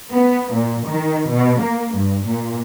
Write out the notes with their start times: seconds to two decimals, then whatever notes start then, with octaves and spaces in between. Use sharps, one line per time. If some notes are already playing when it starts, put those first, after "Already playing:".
0.12 B3
0.53 A#2
0.88 D#3
1.31 B2
1.62 A#3
1.96 G2
2.27 A#2